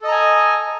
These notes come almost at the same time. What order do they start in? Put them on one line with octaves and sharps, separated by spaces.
A4 D#5 A#5 G#5